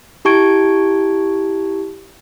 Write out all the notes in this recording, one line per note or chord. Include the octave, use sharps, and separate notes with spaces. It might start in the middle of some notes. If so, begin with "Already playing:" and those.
E4 G4 A5 C#6 G#6 D7